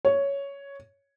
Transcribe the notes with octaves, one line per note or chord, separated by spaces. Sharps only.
C#5